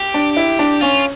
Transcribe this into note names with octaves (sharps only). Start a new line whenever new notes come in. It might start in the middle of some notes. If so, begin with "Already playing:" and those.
Already playing: G4
D4
E4
D4
C#4 F4